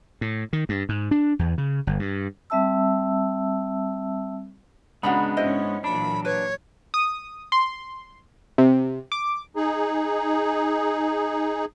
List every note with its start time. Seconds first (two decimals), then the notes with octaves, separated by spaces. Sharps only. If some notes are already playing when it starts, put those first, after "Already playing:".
0.21 A2
0.53 D#3
0.69 G2
0.89 G#2
1.11 D4
1.39 E2
1.58 C#3
1.87 G1
1.99 G2
2.50 G3 C4 E5 A5 E6
5.03 C#3 G#3 B3 D4 F#4 F#5 A#5 B5
5.37 G#2 C#4 E4 C5 D#5
5.84 A#2 E3 F#3 D4 B5
6.25 B4 C#5
6.94 D#6
7.52 C6
8.58 C3
9.12 D6
9.56 D#4 G#4